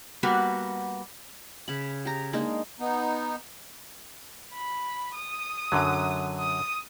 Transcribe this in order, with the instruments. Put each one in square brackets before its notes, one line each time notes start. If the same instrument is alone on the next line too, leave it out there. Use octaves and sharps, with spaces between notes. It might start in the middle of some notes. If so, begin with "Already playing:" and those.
[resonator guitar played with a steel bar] G3 A#3 B3 F#4
[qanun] C#3 B5
G4 A#5
G#3 A#3 D4 D#4
[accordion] B3 D#4
[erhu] B5
D#6
[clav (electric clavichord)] F#2 D3 F#3
[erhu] D#6